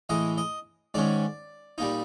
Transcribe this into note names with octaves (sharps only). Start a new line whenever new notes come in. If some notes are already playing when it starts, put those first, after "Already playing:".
A2 E3 G#3 D#5
D#5
G#2 D#3 G#3 C#4 D5
A#2 G3 A#3 D#4